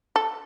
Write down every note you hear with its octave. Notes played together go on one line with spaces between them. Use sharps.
A4